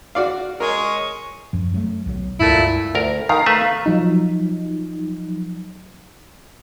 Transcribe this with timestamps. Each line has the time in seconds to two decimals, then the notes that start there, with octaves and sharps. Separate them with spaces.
0.15 F#4 D5 F5
0.60 G#3 A#4 C#5
1.53 F#2 F3
1.74 F#3 G#3 A3
2.06 B1 E3 F#3
2.40 C#2 G2 A#2 A3 E4
2.95 D2 A#4
3.29 D#3 A#4 F5 A#5
3.46 A3 B4 E5
3.86 F3 F#3 D#4